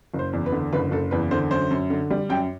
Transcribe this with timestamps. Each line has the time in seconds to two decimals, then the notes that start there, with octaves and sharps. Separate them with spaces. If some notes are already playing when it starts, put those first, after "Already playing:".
0.14 F#1
0.19 C5
0.33 E2
0.46 B4
0.52 D3
0.73 F#1 B4
0.91 F#1 A4
1.11 E2 B4
1.31 D3 C5
1.50 F#2 C5
1.71 F#2
1.90 D3
2.11 G3
2.29 F#2 G5